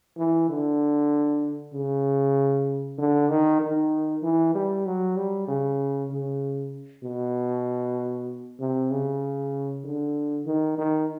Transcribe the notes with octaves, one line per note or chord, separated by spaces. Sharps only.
E3
D3
C#3
D3
D#3
D#3
E3
G3
F#3
G3
C#3
C#3
B2
C3
C#3
D3
D#3
D#3